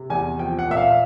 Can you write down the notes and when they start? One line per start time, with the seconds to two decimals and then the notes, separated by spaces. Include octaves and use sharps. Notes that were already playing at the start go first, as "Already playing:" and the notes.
Already playing: C3
0.10 E2 G#5
0.39 F3 G5
0.59 F#5
0.68 A#2 E5
0.77 F5